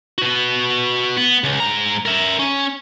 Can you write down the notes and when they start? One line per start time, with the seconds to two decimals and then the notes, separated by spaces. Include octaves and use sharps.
0.18 F#4 B4
1.17 B3
1.44 C#2
1.60 G#2 A#5
2.06 A#4 E5
2.39 C#4